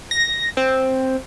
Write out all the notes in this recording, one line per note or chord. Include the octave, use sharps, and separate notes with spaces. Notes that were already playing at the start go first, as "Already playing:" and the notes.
A#6
C4